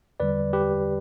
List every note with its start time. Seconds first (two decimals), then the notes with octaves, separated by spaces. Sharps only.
0.20 E2 D3 G3 B4 D5
0.53 G4 B4